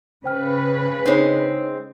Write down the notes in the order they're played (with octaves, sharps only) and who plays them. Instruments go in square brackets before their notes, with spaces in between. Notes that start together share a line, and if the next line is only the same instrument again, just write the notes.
[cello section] C#3 B4 [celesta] C5 G5 F6
[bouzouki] G#3 C4 [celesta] D4 D#4 C#5